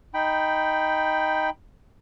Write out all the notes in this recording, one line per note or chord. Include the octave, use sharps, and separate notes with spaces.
D#4 G5 B5